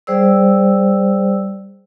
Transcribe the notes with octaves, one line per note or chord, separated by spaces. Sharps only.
G3 G#4 C5 D5 E6